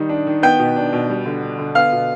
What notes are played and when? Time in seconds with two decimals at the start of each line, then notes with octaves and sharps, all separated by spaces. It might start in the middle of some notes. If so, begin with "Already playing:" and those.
Already playing: D#3 G3 D#4
0.09 D4
0.27 D#3
0.43 B3 G5 G6
0.59 B2
0.76 D4
0.93 B2
1.09 G3
1.26 D3
1.42 D4
1.59 D3
1.75 B3 F5 F6
1.92 B2